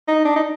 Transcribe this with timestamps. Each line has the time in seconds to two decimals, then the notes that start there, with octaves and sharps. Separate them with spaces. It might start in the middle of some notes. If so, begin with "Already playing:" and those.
0.08 D#4
0.25 D4
0.36 D#4